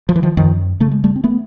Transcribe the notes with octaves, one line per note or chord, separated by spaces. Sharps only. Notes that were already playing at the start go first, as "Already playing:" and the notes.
F3
E3
D#3 F3
F#2 D#3 F3
C#3 A3
G#3
G3 A3
C4
A3 B3